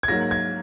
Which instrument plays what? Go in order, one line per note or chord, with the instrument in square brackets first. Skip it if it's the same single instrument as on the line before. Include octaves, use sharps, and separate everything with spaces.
[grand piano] G#6
[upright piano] G#2 F#3 A#3 [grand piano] A#6
[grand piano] G#6